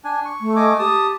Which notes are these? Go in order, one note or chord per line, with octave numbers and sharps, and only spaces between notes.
D4 G#5
C#6
A3
D#5 G#5 D6
G4 A5 D#6